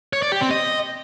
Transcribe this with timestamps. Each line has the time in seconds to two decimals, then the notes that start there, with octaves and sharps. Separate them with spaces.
0.13 C#5
0.22 D5
0.32 G4
0.41 C4
0.51 D#5